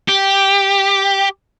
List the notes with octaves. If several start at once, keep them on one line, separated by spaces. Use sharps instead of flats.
G4